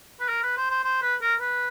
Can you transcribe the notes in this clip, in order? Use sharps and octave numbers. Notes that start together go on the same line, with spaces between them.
B4
A#4
B4
C5
C5
C5
B4
A#4
B4